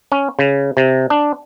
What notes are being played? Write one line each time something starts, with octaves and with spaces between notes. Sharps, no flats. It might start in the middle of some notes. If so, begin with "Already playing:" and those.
C#4
C#3
C3
D4